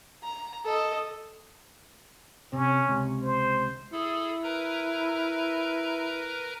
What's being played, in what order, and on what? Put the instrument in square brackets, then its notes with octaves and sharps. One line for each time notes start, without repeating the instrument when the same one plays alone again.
[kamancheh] A#5
A4 D#5
[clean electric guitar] C3 [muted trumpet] C#4
[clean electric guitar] C#2 C3
[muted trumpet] C5
[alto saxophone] E4 [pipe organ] G#4 A4
[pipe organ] A#4 B4 A#5